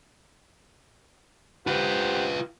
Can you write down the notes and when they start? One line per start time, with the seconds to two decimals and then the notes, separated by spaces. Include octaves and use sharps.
1.67 F4 G4 B4 C5 F#5